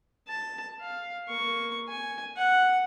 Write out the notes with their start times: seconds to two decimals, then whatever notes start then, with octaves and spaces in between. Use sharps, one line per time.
0.27 A5
0.81 F5
1.28 A#3 C#6
1.88 G#5
2.37 F#5